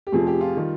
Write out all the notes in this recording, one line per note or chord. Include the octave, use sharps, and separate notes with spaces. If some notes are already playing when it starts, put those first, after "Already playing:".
G4
F1 F2 C3 F3 G#4
G4
F4
D#3 G3